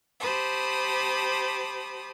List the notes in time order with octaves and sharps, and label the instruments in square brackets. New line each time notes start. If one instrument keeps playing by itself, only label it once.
[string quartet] G4 C5 A5 B5 D#6